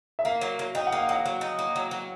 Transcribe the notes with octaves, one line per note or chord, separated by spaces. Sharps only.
E5
A#3 F5
F#3
F#3
D#4 G5
F#5
A#3
F5
F#3 F#5
F#3
D#4
A#3
F#3
F#3